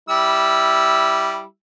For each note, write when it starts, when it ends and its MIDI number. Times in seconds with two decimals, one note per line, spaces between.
0.09 1.43 55
0.09 1.43 64
0.09 1.43 88